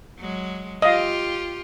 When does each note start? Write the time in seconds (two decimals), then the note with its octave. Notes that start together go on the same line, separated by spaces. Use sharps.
0.19 F#3 G#3
0.82 F4 G4 D#5 F5